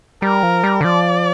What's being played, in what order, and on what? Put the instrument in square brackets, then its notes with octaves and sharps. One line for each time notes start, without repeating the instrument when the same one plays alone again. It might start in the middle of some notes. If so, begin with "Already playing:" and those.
[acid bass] G3 [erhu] A#4
[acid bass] F3
G3
D3
[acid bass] F3 [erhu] D5